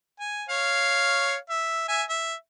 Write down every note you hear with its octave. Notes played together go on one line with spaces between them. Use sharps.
G#5
C#5 F5
E5
E5 G#5
E5